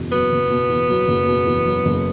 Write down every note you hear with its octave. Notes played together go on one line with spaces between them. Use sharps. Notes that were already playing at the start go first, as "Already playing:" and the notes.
Already playing: F#1 E2 B2
F#3 B3
F#1
B2
E2
F#3
F#1
B2
E2
F#3
F#1